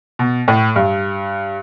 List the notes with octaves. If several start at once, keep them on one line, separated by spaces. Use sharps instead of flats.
B2
A2
G2